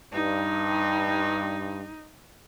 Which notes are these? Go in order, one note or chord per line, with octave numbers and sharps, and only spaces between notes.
G2 D#4